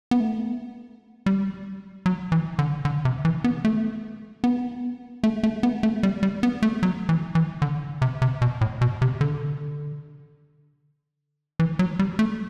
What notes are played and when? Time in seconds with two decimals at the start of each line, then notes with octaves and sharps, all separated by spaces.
0.11 B3
0.20 A3
1.26 G3
2.06 F#3
2.32 E3
2.59 D3
2.85 D3
3.05 C3
3.25 E3
3.44 B3
3.65 A3
4.44 B3
5.24 A3
5.43 A3
5.63 B3
5.83 A3
6.03 G3
6.23 G3
6.43 B3
6.63 A3
6.83 F#3
7.09 E3
7.35 E3
7.62 D3
8.02 C3
8.22 C3
8.42 B2
8.61 A2
8.81 B2
9.02 C3
9.21 D3
11.59 E3
11.79 F#3
11.99 G3
12.19 A3